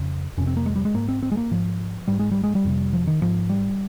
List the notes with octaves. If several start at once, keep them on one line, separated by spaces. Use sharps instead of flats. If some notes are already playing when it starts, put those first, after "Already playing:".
Already playing: F2 C#3
F2 C3 C#4
C4
A#3
G#3
G3
G#3
G#2 A#3
C4
C4
G#3
A#3
G#2 F3
G#2 G3
G#3
G3
G#3
G3
F2 C3
F3
D#3
G#2 F3
G3